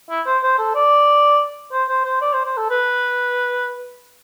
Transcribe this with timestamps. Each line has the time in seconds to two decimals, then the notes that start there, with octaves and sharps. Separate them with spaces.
0.10 E4
0.26 C5
0.43 C5
0.59 A4
0.75 D5
1.72 C5
1.89 C5
2.05 C5
2.21 D5
2.33 C5
2.45 C5
2.57 A4
2.70 B4